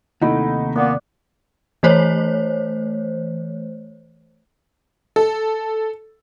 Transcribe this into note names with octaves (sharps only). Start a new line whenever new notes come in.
D#2 C3 A3 D#4 E4 F#5 B5
A#2 A#3 B3 D5 D6 F#6
E3 A3 C5 C#5
A4